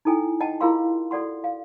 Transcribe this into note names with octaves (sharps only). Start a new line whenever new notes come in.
D#4 E4 A4 G5 G#5
D#5 F#5 G5 A5
E4 F4 G#4 A#4 F5 C6
F#4 A4 D5 F#5 C6
F5